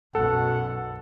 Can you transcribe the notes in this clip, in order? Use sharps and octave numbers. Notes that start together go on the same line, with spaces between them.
B1 F#2 B2 A4 F#5